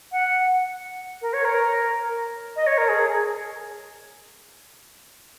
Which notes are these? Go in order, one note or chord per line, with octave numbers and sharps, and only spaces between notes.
F#5
A#4
C#5
A#4
D#5
C#5
A#4
G#4